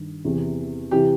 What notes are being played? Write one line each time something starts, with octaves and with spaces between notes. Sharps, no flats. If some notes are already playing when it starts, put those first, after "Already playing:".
Already playing: G2 D#3
E2 C3 E3
C3 E3 G4